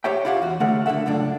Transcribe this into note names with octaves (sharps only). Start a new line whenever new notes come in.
G4 C5 C#5 E5 G5
E4 F4 G4 F5 F#5
E2 F#4
D3 A3 G#4 A#4 C#5 F#5
D2 D3 G#3 A4 E5 F#5
C#2 F#2 A2 D4